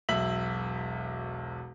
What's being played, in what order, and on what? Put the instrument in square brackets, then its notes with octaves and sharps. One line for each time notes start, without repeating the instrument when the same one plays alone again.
[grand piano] E1 B1 E5 B6 F#7